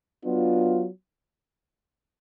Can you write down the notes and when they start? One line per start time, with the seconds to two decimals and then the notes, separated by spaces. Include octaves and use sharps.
0.24 F#3 B3 D4 F4